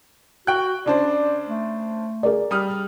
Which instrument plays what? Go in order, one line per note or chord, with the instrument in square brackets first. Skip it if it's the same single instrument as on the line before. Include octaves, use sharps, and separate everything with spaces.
[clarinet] F#4 [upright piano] G5 F#6
[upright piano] C#3 D4 C5 [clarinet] D5
[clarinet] A3
[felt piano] G#4 A#4 D5
[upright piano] G3 D#6 F6